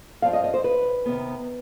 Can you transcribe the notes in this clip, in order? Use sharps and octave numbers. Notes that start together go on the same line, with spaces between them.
G2 F3 C4 F5
D#5
D#5
C5
B4
C3 D#3 B3